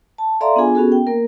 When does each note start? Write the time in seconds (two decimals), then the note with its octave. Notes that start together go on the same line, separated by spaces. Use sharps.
0.18 A5
0.41 A4 D5 E5 F5 A#5 C6
0.56 B3 D4 F4 G#4 G#5
0.75 B3 C#4 F#4 G#4 A4
0.92 G5
1.07 A#3 A#4